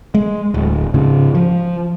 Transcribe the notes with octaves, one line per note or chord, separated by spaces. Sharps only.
G#3
D1
G#2 C#3
F3